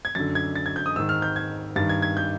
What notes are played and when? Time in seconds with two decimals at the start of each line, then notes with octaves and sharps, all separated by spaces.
0.05 G#6
0.15 F#2 D3 A6
0.35 G#6
0.56 A6
0.66 G#6
0.76 G6
0.86 D#6
0.96 G#2 E6
1.00 D#3
1.09 F6
1.22 G6
1.36 G#6
1.76 G2 D#3 A6
1.89 G#6
2.02 G#6
2.17 G6